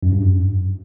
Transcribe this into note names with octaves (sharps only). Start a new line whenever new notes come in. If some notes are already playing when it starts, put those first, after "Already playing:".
F#2
G2
F#2